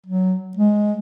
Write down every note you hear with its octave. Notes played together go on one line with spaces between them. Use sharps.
F#3
G#3